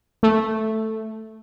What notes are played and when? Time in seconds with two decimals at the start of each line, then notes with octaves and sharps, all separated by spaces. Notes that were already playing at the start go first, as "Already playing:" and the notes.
0.23 A3